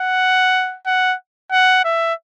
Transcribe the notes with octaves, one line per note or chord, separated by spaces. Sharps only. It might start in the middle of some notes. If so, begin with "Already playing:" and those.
Already playing: F#5
F#5
F#5
E5